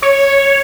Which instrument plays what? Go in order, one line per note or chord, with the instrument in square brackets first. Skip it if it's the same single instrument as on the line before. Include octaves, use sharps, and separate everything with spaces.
[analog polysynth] C#5